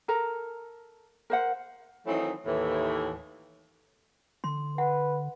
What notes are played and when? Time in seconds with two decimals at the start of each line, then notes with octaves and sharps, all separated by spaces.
0.08 A4 A#4 A#5
1.30 A#4 C5 F#5
2.06 D#3 E3 F#3 A3 C4 D#4
2.46 D#2 A2 E3
4.44 D3 C6
4.78 B4 F#5